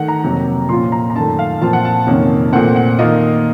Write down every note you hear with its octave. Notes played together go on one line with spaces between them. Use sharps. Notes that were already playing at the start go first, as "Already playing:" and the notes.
Already playing: D#3 A3 F#5
A#5
F2 C3 F#3 A#3
A#2 F3 A#3 C#4 F4 C6
A#5
A#5
F#2 D#3 A3 A5
F5
A#2 F3 C4 F4 A5
F#5
A5
F2 C3 D#3 A#3 C#4
A#2 A3 C4 F#5
F#5
D#3 A#3 F4 D#5